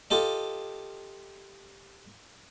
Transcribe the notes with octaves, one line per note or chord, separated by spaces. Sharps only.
F4 G4 A4 D#5